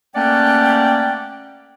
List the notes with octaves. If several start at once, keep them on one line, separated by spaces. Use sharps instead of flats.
A3 A#3 C#4 D5 F#5 G5